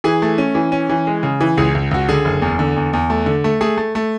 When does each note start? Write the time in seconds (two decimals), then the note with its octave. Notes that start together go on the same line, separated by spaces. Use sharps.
0.04 E3 G#4
0.22 A3
0.38 C#4
0.55 E3
0.72 C#4
0.89 E3
1.07 G#3
1.23 C#3
1.41 E3
1.57 C#2 G#4
1.75 C#2
1.91 C#2 F#4
2.09 D3 G#4
2.25 F#1
2.42 E2
2.59 D3
2.76 E2
2.93 E2
3.10 A3
3.26 D3
3.44 A3
3.61 A3 G#4
3.77 A3
3.95 A3